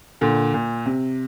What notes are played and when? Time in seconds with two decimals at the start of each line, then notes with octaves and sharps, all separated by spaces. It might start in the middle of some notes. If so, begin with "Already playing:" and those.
0.21 A#2 D3
0.54 A#2
0.86 C3